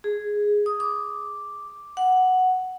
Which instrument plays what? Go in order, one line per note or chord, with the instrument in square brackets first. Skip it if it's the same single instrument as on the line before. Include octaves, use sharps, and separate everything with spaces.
[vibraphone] G#4
D#6
D6
F#5